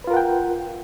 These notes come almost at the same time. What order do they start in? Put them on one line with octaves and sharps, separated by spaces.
B4 F4 A#4 F#5 G5